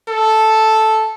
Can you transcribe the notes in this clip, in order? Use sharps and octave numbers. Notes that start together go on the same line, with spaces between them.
A4